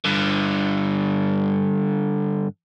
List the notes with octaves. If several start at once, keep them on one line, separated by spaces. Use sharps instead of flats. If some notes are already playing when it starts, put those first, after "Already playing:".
G2 D3